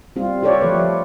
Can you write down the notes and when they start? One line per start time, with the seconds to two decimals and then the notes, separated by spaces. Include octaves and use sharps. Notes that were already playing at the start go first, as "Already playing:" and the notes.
0.16 G3 C4 F4
0.43 F4 G4 A4 C#5 D5
0.61 F3 A3 B4